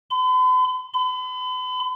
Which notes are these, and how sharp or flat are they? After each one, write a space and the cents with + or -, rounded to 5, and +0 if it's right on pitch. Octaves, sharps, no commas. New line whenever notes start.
B5 +45
B5 +40